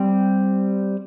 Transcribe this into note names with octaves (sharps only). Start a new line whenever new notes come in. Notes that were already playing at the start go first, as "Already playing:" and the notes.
Already playing: G3 C4